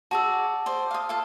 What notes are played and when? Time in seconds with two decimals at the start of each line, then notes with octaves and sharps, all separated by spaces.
0.11 F#4 G#4 D5 A5 E6
0.66 C5 D5
0.91 F5 D#6
1.09 F4 A4 F5